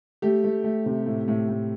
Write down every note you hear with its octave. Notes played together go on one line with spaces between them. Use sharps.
A3 G4
A3
A3
C3
A2
A2
A2